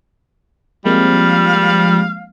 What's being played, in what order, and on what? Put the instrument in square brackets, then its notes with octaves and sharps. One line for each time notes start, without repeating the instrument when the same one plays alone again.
[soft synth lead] F3 [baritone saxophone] G3 [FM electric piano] G#3 A#3 C4 [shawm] F5